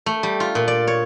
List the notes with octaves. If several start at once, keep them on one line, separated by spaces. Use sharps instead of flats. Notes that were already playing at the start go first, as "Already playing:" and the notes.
A3
G3
F4
A#2
D5
C#5